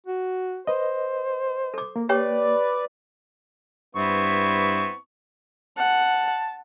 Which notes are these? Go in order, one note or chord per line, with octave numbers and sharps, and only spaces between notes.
F#4
B4 C5 D#5
A4 D6
A#3
G4 B4 C#5 D5 G5
G2 B3 C4 E4 C#6
F#5 A5